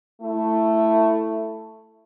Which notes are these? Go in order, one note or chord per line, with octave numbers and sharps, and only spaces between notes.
A3 E4